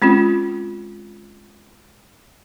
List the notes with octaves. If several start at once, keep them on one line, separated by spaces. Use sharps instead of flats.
G#3 C4 C#4 F4